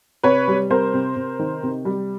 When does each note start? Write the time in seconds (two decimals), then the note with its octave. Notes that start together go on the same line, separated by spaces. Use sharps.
0.23 C3 B4 C#5
0.48 G3
0.70 C3 A#4 C5
0.94 C3
1.16 C3
1.39 D#3
1.63 C3
1.85 G3